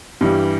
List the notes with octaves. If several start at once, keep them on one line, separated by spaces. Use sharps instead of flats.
G2 E3 G3